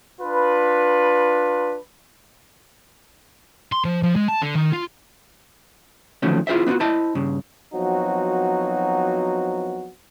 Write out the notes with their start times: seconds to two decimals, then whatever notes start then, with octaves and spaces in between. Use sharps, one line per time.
0.21 D4 F4 B4
3.72 C6
3.85 F3
4.03 F3
4.16 G#3
4.29 A5
4.42 D3
4.56 D#3
4.73 F4
6.22 D3 D#3 F3 F#3 A3 C#4
6.47 E4 F4 G#4 C5 E5
6.67 B3 D4 D#4 F4 F#4
6.80 E4 C5 D#5 E5 A5
7.15 G2 C#3
7.74 F3 F#3 B3 C4 D#4 F#4